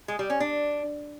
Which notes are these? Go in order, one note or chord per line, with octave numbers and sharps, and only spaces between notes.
G#3
G3
C#4
D4